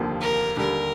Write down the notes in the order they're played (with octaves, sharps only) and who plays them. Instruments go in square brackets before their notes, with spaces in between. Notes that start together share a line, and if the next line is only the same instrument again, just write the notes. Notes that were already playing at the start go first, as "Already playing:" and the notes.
Already playing: [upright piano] F1 D#2 D3 F3 A#3
[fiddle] A#4
[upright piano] D#2 D3 G3 [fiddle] A#4